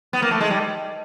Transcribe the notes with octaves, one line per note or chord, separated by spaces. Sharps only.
B3
A#3
A3
G#3
G3